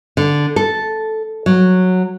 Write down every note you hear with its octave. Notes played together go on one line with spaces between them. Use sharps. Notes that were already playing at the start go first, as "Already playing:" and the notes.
D3
A4
F#3